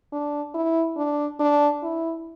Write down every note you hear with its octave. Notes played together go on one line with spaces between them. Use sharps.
D4
E4
D4
D4
E4